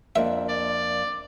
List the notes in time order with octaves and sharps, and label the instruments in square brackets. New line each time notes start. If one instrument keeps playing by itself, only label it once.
[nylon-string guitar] F2 A#3 D4 [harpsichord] E5
[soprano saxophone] D5